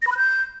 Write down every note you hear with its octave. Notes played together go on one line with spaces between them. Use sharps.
A#6
B5
F#6
G6